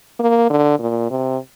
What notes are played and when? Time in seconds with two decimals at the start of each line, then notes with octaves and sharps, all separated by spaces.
0.20 A#3
0.50 D3
0.80 A#2
1.10 C3